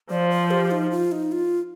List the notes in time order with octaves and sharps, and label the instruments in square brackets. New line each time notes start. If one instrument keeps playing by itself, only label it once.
[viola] F3 [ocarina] D5
[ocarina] C5
G4
D#4
F4
D#4
F4